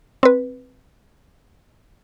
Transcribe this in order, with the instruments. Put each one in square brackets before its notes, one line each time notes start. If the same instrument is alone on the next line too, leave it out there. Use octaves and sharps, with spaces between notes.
[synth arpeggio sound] C4 B4